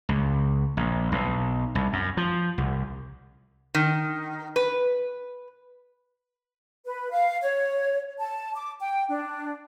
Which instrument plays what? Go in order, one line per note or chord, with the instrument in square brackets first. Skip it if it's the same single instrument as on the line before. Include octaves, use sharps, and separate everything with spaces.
[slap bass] C#2
A#1
B1
C2
F#2
F3
C2
[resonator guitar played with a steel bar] D#3
B4
[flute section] B4
F5
C#5
A5
D6
G5
D4